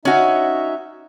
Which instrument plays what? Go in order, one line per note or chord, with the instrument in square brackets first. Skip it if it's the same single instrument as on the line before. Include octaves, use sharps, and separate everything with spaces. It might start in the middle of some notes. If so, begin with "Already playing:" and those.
[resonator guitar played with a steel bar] C#4 F#4 [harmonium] D#4 E5